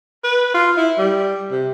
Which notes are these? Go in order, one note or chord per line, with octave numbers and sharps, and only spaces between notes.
B4
F4
E4
G3
C3